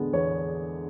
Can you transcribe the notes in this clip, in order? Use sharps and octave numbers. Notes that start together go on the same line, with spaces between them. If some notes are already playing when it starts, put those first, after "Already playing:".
Already playing: E2 D3 G#3 B3
E2 C#5